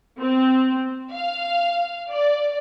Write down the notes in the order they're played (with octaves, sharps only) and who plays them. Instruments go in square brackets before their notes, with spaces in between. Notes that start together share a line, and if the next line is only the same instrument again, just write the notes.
[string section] C4
F5
D5